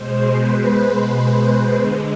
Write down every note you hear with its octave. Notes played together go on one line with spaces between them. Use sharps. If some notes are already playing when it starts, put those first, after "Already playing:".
Already playing: B2 G#3 C5
B4
C5
D3
G#3